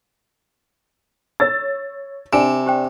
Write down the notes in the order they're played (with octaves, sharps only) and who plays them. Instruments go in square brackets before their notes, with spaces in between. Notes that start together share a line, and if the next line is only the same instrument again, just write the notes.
[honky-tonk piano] C#5 E6 A6
[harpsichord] C3 [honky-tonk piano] D4 E7 [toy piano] G#5
[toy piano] G4 C5 G5